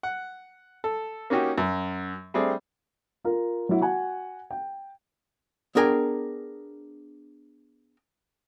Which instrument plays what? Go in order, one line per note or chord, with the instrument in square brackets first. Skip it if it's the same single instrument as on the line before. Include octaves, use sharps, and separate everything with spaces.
[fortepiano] F#5
A4
A#3 C#4 D#4 F#4 G4
F#2
G3 A3 C4 D4 G#4
[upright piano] F4 A#4
F#3 E4 F#4
F#4 F#5 G#5
G5
[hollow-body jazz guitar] B3 D4 G#4 A#4 G5 G#5